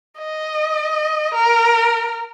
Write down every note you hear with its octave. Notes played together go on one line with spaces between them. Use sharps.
D#5
A#4